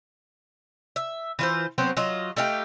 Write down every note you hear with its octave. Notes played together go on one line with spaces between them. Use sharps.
E5
E3 F4 C5
F#3 B3 C4 C5
F#3 F4 D#5
A3 D#4 F4 G4